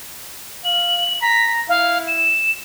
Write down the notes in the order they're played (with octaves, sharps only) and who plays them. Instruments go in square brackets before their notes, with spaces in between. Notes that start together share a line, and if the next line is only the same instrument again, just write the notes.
[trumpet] F5 [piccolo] F#7
[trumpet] A#5 [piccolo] B6
[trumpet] E4 [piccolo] F5
[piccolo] E7